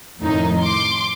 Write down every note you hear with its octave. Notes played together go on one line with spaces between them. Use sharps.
F2 A2 D#3 D#4
C6 D6